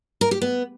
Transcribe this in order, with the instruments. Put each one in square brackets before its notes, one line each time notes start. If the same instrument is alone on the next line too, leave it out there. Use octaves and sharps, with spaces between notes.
[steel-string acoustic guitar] A#4
G4
B3